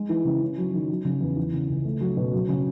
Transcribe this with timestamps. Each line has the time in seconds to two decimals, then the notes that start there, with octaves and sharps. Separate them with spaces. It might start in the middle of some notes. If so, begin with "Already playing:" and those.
Already playing: G#3
0.09 E3
0.25 C#3
0.41 C#4
0.58 F#3
0.73 D#3
0.90 F#3
1.05 C#3
1.21 E2
1.36 E3
1.53 C#3
1.69 C#2
1.84 A3
2.01 F#3
2.17 B2
2.33 F#3
2.49 C#3